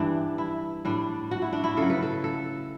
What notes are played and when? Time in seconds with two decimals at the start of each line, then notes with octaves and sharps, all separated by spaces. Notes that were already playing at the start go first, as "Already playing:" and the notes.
Already playing: G2 E3 G3 D4
0.38 E4
0.85 A2 G3 D4
1.31 F#4
1.42 E4
1.53 D4
1.64 E4
1.77 C#3 F#3 A4
1.90 B4
2.02 A4
2.24 A4